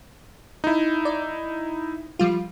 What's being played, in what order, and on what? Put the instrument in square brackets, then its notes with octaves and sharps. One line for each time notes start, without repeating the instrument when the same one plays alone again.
[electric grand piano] D#4 E4
[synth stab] D5
F3 G3 F4